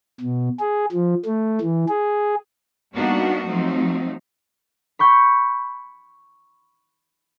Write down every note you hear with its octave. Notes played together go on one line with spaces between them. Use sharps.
B2
G#4
F3
A3
E3
G#4
G3 A#3 B3 D4 D#4 F#4
F3 F#3 A3 C4 D#4
B5 C#6 G6